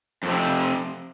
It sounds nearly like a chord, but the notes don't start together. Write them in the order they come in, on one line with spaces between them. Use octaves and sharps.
F2 A2 C3